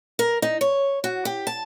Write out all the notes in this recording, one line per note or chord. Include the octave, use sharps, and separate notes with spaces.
A#4
D#4
C#5
F#4
G4
A5